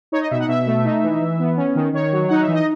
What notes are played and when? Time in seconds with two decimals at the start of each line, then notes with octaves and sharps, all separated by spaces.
0.12 D#4 C#5
0.21 D#5
0.31 B2 E5
0.39 F#5
0.48 B2 E5
0.67 A3
0.85 D#4
1.03 E3
1.21 E3
1.39 B3
1.57 C#4
1.75 D#3
1.93 D#3 C#5
2.12 F#3
2.28 D#4 F#5
2.41 E5
2.48 E3
2.53 D#5